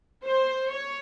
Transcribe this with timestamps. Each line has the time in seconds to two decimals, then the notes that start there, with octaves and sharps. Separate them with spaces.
0.24 C5
0.70 C#5